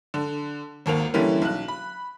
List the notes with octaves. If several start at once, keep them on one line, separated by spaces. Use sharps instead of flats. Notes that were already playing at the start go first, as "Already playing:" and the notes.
D3
G#1 D#2 A#3 F7
D3 E3 G3 A#3 C#4 E4
B1 F#6
B5